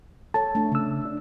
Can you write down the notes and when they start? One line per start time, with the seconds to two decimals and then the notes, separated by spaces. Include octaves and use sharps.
0.34 A4 C#5 A5
0.55 A3 D4
0.72 C#3 A3 E6
1.05 D4